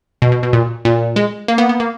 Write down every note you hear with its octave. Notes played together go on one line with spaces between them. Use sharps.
B2
B2
B2
A#2
A#2
G#3
A#3
B3
B3
A#3